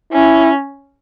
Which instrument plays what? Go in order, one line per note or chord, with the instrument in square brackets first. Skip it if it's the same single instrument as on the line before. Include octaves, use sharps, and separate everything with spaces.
[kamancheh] C#4 [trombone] E4